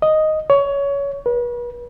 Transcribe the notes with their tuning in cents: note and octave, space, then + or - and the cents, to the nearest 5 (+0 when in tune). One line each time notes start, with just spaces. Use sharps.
D#5 +0
C#5 +20
B4 -40